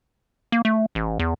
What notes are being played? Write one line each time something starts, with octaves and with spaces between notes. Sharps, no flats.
A#3
A3
A1
E2